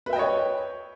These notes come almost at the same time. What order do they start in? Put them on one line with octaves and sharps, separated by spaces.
B4 E5 G5 D#5 C#5